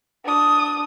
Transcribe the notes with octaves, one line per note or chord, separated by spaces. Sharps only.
D4 D#6